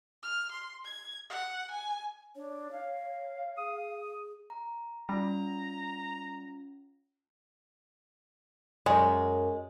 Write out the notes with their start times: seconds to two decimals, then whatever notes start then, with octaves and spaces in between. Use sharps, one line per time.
0.23 F6
0.52 C6
0.85 G#6
1.29 F#5
1.71 G#5
2.36 D4 C#5
2.71 F5
3.58 G#4 D#6
4.50 A#5
5.09 G3 C#4 F4 A#5
8.86 F#2 G#3